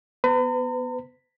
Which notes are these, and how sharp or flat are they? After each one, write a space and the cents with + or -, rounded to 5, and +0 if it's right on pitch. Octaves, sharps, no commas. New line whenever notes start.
B3 +0 B4 +35 A#5 -40